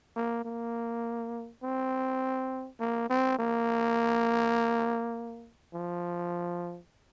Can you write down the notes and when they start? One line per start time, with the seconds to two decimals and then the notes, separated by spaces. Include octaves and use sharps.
0.16 A#3
0.45 A#3
1.63 C4
2.80 A#3
3.10 C4
3.39 A#3
5.74 F3